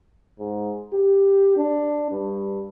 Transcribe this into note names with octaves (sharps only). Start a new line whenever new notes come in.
G#2
G4
D4
G2